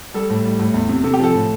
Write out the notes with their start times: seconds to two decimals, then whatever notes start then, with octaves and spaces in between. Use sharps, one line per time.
0.14 G3 A4
0.30 A2
0.45 G3
0.60 A2
0.74 E2
0.89 C3
1.04 C3 A4
1.14 G4
1.20 F3 A4
1.35 A2